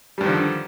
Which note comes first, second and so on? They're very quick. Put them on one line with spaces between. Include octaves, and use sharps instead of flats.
G3 G2 D#3 F3 D3